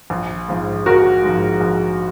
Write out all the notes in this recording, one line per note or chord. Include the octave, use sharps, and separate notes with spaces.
A#1
G#2 F3
A#1 F#4 A#4
G#2
F3
A#1